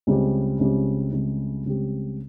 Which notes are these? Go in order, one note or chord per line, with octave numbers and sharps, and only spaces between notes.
C#2 C#3 G3 C4 G4
C#2 C#3 G3 C4 G4
C#2 C#3 G3 C4 G4
C#2 C#3 G3 C4 G4